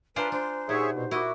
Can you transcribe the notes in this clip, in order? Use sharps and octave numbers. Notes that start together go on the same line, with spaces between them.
D4 F4 B4 C5 G#5 A#5
D4 C5
A#2 D#4 G4 G#4 C#5 E5 F#5
B2
E4 F#4 A#4 D#5 E5 D6